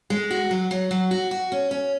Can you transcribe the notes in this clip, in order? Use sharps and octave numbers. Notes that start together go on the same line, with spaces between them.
G#3
F#4
F#3
F#3
F#3
F#4
F#4
C#4
C#4